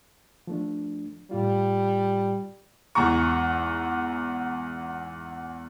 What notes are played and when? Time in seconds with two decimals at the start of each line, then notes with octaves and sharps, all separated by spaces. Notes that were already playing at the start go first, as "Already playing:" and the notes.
0.47 F3 A3 D4
1.31 A2 G3 F4
2.95 E2 G#2 A#5 C#6